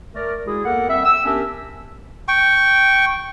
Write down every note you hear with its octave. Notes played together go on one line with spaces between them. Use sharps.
A3 A#4 D5
G#3 E4 F#4 G#4
E2 A#3 A4 A#4 F#5
G3 C4 E5
E6
B3 C#4 D4 G4 A#4 E5
G5 C#6